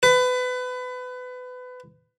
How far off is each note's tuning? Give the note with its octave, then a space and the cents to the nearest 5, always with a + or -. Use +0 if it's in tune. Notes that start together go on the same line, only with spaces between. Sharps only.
B4 +25